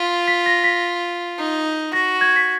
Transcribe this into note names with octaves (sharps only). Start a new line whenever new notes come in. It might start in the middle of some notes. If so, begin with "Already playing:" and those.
Already playing: F4 B6
B6
A#6
B6
D#4
F#4 A#6
G#6
B6